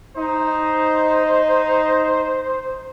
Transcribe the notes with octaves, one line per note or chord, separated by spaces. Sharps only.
D#4 C5